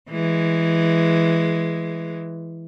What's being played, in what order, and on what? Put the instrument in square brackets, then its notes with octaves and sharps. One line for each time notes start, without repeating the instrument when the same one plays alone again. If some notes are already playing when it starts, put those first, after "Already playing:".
[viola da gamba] E3 G#3